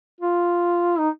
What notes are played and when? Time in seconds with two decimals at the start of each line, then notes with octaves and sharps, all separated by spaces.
0.21 F4
0.99 D#4